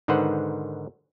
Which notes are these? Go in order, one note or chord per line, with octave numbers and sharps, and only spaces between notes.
G#2 D3 D#3 B4 C5 F#5